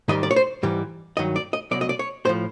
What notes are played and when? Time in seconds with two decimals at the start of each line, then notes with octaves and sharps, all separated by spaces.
0.08 G#2 D#3 G3 D#5
0.23 D5
0.31 C#5
0.36 C5
0.63 G#2 E3 G3
1.17 G2 D#3 F#3 D#5
1.36 D5
1.53 D#5
1.71 C2 B2 F#3 D5
1.81 D#5
1.89 D5
1.99 C#5
2.25 A2 F3 C5